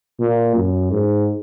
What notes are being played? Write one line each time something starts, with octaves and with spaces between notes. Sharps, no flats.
A#2
F#2
G#2